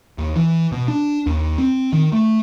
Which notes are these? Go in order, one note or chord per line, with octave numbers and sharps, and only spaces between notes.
D#2
E3
B2
D4
D#2
C4
D#3
A3